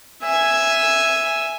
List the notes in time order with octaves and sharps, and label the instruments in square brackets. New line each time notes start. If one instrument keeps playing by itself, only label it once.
[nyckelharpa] E5 G#5